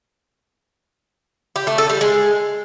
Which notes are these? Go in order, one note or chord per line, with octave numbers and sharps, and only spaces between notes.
G4
A3
A4
G3
G#3